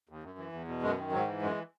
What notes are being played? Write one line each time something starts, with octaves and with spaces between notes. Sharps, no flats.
D#2
F#2
E3
E2
B2
F#2 G#3
D#3
G#2 F#3
E3
F#2 G#3